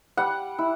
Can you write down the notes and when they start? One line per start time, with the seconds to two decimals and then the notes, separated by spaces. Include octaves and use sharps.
0.17 G3 F#5
0.58 E4